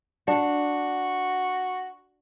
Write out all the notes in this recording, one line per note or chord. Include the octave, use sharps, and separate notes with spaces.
D4 F#4